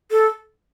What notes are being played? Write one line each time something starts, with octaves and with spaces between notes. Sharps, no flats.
A4